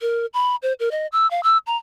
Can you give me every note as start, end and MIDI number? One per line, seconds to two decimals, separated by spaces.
0.01 0.26 70
0.34 0.56 83
0.62 0.73 72
0.80 0.89 70
0.91 1.07 75
1.12 1.29 88
1.31 1.41 77
1.43 1.58 88
1.67 1.77 82